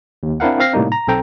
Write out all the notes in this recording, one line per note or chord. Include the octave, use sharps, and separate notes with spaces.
D#2
C4 D4 E4 A#4 F5 F#5
C4 F5 A#6 C7
A2 C3 G3 A#3 D#4
A#5
B1 C4 A4 G5 A#5